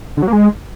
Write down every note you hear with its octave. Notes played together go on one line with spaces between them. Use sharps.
D3
F#3
A#3
G#3